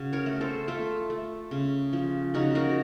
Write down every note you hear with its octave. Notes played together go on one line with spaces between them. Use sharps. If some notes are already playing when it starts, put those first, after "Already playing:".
Already playing: C#3 F#4
A#4 C#5
A3
A4 C5
A3 F4 A4
A3
C#3
F3
C#3 D#4 F#4
F#4 A#4